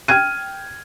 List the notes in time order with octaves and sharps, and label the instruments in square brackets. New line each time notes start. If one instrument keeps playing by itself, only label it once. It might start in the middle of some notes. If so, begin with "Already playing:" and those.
[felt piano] G5 F6 G#6 D#7